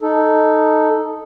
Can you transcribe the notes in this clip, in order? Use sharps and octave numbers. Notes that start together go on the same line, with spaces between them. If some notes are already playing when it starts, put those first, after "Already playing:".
D#4 A4